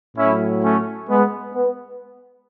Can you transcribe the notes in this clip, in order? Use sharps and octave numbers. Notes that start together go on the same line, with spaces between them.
A2 F#3 C#4 E4
A3 C#4
G#3 B3
B3